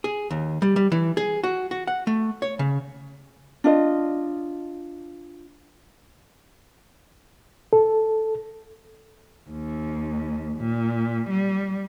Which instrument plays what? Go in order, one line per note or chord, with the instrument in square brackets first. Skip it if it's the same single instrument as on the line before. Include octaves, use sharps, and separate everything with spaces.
[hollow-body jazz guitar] G#4
D#2
G3
G3
E3
G#4
F#4
F#4
F#5
A3
C#5
C#3
[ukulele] D4 F4 D#5
[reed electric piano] A4
[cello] D#2
A#2
G3